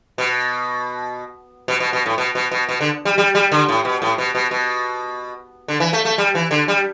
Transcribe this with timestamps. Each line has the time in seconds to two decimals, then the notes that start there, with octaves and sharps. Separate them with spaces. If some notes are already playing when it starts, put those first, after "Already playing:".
0.18 B2
1.68 B2
1.80 B2
1.93 B2
2.06 A2
2.18 B2
2.35 B2
2.51 B2
2.69 B2
2.81 D3
3.05 G3
3.18 G3
3.35 G3
3.52 D3
3.68 A2
3.85 B2
4.02 A2
4.18 B2
4.35 B2
4.51 B2
5.68 D3
5.80 E3
5.93 A3
6.05 A3
6.18 G3
6.35 E3
6.51 D3
6.68 G3